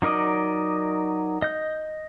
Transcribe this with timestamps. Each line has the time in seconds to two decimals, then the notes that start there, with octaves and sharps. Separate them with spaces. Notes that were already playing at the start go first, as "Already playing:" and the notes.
0.02 F#3 D#4 A#4 D5 D#5
1.42 D#5 G6